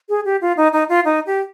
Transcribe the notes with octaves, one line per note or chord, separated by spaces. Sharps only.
G#4
G4
F4
D#4
D#4
F4
D#4
G4